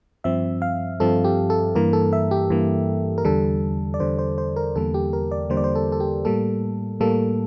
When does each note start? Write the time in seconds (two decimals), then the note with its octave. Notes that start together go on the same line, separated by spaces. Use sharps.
0.24 G2 F3 C4 E5
0.62 F5
1.00 G2 F3 C4 A4
1.24 G4
1.50 A4
1.75 G2 E3 A#3 A#4
1.93 A4
2.13 E5
2.31 G4
2.50 G2 E3 A#3
3.18 A#4
3.25 E2 D3 G3 A4
3.94 D5
4.00 E2 D3 G3 C5
4.19 C5
4.38 C5
4.56 A#4
4.75 E2 D3 G3 A#3 A4
4.94 G4
5.13 A#4
5.31 D5
5.50 E2 D3 G3 A#3 C5
5.57 D5
5.64 C5
5.75 A4
5.92 A4
6.00 G4
6.25 A2 G3 A#3 A4
7.00 A2 G3 A#3 A4